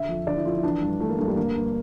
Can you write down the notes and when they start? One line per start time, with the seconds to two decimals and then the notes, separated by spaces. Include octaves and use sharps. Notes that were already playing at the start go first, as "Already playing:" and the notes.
Already playing: D3 E5
0.08 F2
0.27 D3 D5
0.36 E4
0.45 F2 F4
0.55 E4
0.63 E3 D4
0.82 G2
1.00 E3 A3
1.09 A#3
1.18 G2 A3
1.28 G3
1.37 D3 A#3
1.55 G2